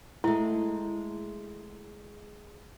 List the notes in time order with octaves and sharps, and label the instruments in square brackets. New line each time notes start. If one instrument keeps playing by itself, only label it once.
[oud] G#3 A3 [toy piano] E4